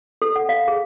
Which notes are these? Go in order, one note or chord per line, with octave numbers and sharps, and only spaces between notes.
A4
F#5
F5
G#4